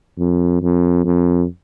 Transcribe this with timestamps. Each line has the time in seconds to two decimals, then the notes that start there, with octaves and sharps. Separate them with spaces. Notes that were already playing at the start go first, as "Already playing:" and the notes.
0.18 F2
0.62 F2
1.05 F2